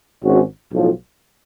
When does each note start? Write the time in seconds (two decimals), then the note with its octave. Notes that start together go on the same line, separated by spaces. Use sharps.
0.24 G#1 G#2 G#3 C#4 F#4
0.72 B1 A2 F3